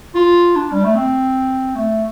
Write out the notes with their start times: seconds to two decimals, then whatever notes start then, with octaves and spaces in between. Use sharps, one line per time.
0.15 F4
0.55 D4
0.72 G3
0.84 A3
0.95 C4
1.75 A3